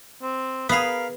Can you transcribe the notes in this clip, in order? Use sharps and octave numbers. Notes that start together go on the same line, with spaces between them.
C4
B3 G#4 A#4 F5 B5